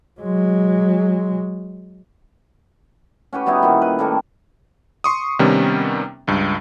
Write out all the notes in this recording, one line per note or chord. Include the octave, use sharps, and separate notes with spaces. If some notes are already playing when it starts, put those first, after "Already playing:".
F#3 G#3
C#4 F#4 G4 B4
G3 B3 D#4 E4
A#2 D#3
B4
A2 G3 A#3 A4
C6 C#6 D#6
C3 D#3 G3 B3 C#4
C#2 G2